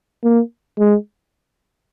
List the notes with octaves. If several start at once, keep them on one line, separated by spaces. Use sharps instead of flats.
A#3
G#3